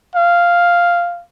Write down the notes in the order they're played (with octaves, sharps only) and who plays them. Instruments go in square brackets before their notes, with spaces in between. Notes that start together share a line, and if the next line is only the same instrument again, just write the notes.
[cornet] F5